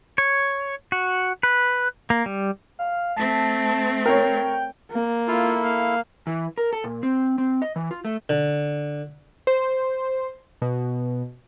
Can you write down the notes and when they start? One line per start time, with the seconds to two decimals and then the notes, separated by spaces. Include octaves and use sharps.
0.18 C#5
0.92 F#4
1.43 B4
2.10 A#3
2.26 G3
2.79 F5
3.17 A3 C4 A5
4.06 A#4 C#5 G5
4.92 A#3
5.28 E4 F4 A4
5.63 F5
6.27 E3
6.58 A#4
6.73 A4
6.84 A#2
7.03 C4
7.38 C4
7.62 D#5
7.76 E3
7.91 F4
8.05 A3
8.29 D3
9.47 C5
10.62 B2